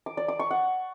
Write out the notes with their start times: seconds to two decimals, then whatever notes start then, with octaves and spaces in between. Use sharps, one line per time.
0.06 D6
0.17 D5
0.28 D6
0.39 C#6
0.51 F#5